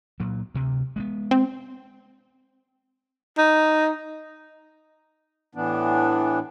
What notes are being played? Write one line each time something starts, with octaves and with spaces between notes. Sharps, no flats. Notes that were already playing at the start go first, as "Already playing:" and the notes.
A#2 F#3
D2 C3
G#3 A#3 B3
C4
D#4
A2 E3 B3 D4